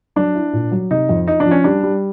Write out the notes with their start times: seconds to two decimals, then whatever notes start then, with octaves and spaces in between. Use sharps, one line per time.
0.16 F#3 D4
0.35 E4
0.53 A#2
0.71 F#3
0.91 C3 D#4
1.09 F2
1.28 F3 D#4
1.40 D4
1.46 F3
1.51 C#4
1.64 G3 D4
1.83 G3